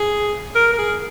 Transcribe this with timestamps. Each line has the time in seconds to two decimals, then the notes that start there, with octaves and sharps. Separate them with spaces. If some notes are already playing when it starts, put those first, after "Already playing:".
Already playing: G#4
0.55 A#4
0.73 A#4
0.78 G#4